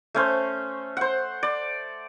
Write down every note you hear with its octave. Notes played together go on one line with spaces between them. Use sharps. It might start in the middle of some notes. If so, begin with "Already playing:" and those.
A3 C#4 C5
C5 F#5
D5